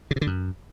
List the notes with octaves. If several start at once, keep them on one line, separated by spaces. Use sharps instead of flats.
C#3
C3
D3
F#2